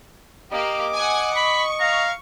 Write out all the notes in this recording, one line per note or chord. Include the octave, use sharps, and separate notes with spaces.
A#3 G4 D#5 D6
F#5 G#5
B5 C#6
F5 A#5